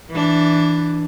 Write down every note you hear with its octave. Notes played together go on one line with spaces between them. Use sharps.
E3 D4